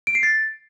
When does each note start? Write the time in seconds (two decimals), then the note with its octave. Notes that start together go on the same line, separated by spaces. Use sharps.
0.07 D7
0.15 C7
0.23 A6